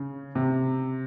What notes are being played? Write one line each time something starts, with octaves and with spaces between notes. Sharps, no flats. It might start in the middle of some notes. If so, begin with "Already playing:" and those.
Already playing: C#3
C3